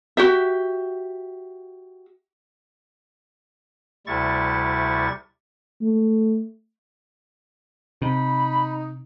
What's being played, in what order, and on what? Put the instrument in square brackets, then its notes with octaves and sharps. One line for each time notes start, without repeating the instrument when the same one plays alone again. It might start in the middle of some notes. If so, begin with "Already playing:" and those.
[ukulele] F#4 G4 E5
[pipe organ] D2 C3 G3 E4 C#6 A6
[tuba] A3
[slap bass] C3 [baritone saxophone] D#4 [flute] B5